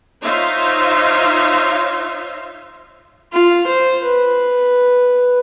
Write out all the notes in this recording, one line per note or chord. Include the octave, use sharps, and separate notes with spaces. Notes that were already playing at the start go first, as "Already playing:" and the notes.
D#4 F4 C5 C#5 E5 F5
F4
C5
B4